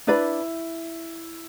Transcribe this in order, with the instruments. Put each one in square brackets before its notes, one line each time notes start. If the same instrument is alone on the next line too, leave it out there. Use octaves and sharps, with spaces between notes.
[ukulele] D4 B4 D5 B5 [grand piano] E4